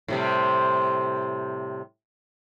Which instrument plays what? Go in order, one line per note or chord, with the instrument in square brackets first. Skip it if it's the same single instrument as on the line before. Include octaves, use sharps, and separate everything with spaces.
[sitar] A2 C3 G3